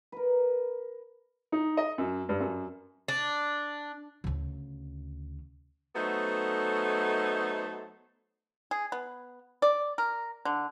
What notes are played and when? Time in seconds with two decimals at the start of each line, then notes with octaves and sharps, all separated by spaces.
0.12 A#4 B4
1.52 D#4
1.77 D#5
1.98 F#2
2.29 G2
2.40 F#2
3.08 D4
4.24 D2 C#3
5.95 F#3 A3 B3 D#4 A4 C5
8.71 G#4
8.92 B3
9.62 D5
9.98 A#4
10.45 D3